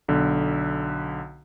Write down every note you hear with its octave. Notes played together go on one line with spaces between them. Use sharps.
B1 D3